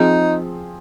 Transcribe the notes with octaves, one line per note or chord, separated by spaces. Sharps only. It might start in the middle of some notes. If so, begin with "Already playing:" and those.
Already playing: F3 C4 D#4 G#4